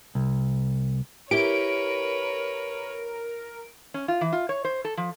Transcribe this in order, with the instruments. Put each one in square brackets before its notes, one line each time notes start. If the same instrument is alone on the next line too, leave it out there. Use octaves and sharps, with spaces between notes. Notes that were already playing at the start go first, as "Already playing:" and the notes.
[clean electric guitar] C2
[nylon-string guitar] E4 G4 [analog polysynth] A#4 [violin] B4 C#5 [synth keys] D7
[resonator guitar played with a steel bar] C#4
F4
E3
F4
C#5
C5
A4
F3